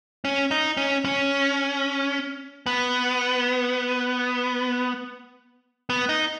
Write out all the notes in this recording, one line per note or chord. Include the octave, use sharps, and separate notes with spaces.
C#4
D#4
C#4
C#4
B3
B3
D#4